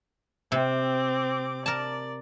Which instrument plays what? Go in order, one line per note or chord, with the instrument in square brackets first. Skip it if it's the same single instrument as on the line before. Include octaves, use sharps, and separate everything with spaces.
[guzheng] C3 [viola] C4 D6
[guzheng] A#4 A5 [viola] D5